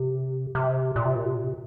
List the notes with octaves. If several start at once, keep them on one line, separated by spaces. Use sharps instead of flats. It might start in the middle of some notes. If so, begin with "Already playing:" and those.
Already playing: C3
C3
A#2
C3
A#2
C3
A#2
C3